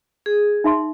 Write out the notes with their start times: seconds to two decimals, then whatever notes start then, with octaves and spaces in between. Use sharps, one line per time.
0.26 G#4
0.64 D#4 E5 C6